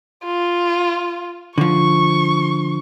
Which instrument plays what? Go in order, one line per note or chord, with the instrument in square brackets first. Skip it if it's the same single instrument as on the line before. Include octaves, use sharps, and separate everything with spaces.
[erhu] F4
[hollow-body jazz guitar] D3 F3 [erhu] C#6